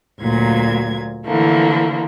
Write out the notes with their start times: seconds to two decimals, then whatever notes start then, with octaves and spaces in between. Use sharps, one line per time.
0.21 D2 A#2 F#3 G#6
1.26 D3 E3 F3 A3 A#3